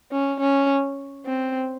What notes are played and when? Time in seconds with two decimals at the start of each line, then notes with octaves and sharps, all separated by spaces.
0.12 C#4
0.40 C#4
1.26 C4